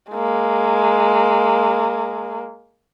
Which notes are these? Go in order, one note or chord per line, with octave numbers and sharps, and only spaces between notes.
G#3 A#3